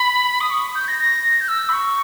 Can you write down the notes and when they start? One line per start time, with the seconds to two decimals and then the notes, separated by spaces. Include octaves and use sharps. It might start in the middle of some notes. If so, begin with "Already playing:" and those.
Already playing: B5
0.41 D#6
0.50 C#6
0.75 G6
0.88 A#6
0.99 A#6
1.41 G6
1.48 E6
1.69 B5
1.73 C#6